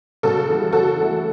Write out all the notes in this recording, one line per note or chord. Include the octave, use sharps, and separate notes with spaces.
C#3 F#4 A4
E3 G3
C#3 F#4 A4
E3
A3